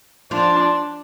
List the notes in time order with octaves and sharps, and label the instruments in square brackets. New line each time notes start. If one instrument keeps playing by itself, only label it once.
[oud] F3 F4 [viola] D4